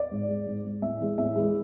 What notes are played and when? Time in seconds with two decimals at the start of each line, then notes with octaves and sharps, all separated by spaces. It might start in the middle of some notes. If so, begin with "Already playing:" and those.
Already playing: D5
0.11 G#2
0.29 G#3
0.47 G#2
0.65 G#3
0.82 A2 E5
1.00 E3 G#3
1.18 A2 E5
1.36 E3 G#3